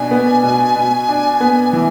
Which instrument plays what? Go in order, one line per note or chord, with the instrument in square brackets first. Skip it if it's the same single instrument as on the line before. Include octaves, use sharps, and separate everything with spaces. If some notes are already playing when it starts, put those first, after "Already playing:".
Already playing: [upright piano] B2 D4 [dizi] G#5
[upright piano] B3
B2
B2
D4
B3
E3